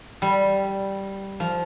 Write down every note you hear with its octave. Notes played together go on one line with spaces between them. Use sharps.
G3
F3